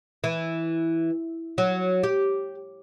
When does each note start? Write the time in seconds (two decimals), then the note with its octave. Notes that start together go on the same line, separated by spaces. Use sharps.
0.24 E3
1.58 F#3
2.03 G4